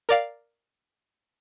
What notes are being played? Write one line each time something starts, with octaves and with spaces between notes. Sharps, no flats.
A#4 D5 F5